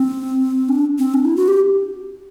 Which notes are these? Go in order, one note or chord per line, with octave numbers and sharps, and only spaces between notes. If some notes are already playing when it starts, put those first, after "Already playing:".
Already playing: C4
D4
C4
D4
E4
F#4
G4